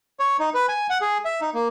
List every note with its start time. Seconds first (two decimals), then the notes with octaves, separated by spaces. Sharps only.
0.20 C#5
0.39 D#4
0.54 B4
0.69 G#5
0.90 F#5
1.01 G#4
1.25 E5
1.41 D#4
1.54 A#3